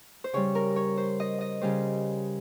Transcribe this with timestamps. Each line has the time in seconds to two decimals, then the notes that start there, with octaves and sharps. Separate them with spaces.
0.24 C5
0.33 C#3 G3 C#5
0.55 A#4
0.76 C#5
0.97 C5
1.20 D#5
1.41 D#5
1.61 C#3 G3 C5